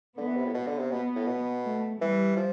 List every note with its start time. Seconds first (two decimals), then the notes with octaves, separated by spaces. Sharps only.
0.18 D3 B3
0.28 E3
0.37 C3
0.46 A2
0.54 B2
0.67 D3
0.79 C3
0.91 B2 B3
1.16 A2
1.27 B2
1.64 A3
2.01 E3 G3
2.37 F3